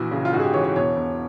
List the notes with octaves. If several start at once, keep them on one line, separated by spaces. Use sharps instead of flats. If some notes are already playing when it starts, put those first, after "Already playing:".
Already playing: A#1 E3 F#4
C#3
F4
G#2 F#4
G#4
G4
E3 C#5
C#5
E1 C#5
E1